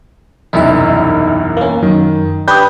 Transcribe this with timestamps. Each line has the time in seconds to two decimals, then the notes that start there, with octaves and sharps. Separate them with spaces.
0.53 E1 C2 F#2 D#4 E4 E5
1.57 A#3 C#4
1.83 F#2 D#3
2.48 D4 G4 B4 D#6 G6